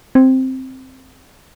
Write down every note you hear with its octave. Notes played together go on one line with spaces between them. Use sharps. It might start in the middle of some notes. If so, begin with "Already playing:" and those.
C4